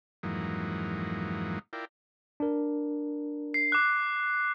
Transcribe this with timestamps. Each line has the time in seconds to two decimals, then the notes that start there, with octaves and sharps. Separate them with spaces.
0.23 F2 G#2 E3 F#3 A#3 D#4
1.73 E4 F4 A#4 D5 G5
2.40 D4 A#4
3.54 C7
3.72 D6 F#6